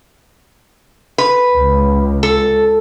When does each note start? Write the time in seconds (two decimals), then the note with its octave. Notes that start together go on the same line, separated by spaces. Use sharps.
1.18 B4
1.56 C#2
2.23 A4